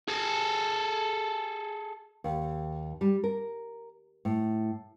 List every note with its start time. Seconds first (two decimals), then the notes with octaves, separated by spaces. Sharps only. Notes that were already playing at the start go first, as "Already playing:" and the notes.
0.08 G#4 A4
2.24 D#2
3.01 G3
3.24 A#4
4.25 A2